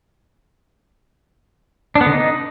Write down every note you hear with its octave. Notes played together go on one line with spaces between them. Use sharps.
D4
B3
D3
D#4